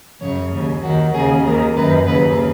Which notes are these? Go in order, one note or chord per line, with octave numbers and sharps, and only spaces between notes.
F#2 C#3 C#5
D#2 C#3
D#2 D#3 F#4
D#2 C#3 G#4
D#2 D#3 A#4
F#2 D#3 B4
D#2 C#3 B4